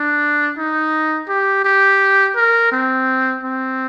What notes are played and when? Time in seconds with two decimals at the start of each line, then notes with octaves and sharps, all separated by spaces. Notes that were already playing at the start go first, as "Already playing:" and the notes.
Already playing: D4
0.58 D#4
1.28 G4
1.65 G4
2.36 A#4
2.72 C4
3.43 C4